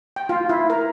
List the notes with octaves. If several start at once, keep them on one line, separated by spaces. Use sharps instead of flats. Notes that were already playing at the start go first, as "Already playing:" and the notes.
G5
F4
E4
A#4